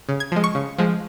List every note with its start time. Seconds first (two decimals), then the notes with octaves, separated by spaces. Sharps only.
0.09 C#3
0.20 G#6
0.32 F3 G#3
0.44 C#6
0.55 C#3
0.78 F3 G#3